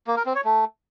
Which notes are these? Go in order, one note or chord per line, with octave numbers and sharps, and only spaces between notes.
A#3
A#4
C4
C#5
A3